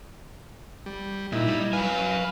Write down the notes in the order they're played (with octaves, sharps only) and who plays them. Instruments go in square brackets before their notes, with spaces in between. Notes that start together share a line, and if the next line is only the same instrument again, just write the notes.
[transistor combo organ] G3
[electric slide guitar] A#2 [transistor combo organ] D#4 E4
[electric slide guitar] G3
[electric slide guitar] F#3 G#5 [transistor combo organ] B4 F5